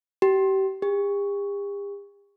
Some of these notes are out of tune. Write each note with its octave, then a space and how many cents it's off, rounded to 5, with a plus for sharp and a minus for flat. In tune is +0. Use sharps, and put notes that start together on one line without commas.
G4 -30
G4 +45